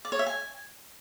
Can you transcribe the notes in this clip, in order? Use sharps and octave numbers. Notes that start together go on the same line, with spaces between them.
D5
C#5
E5
G#5